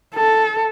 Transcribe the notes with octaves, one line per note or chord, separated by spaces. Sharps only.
A4